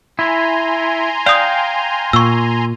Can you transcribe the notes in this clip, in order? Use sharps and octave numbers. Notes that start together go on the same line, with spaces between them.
E4 G#5 A#5 C6
D5 F5 G5 D#6
A#2 C#6 E6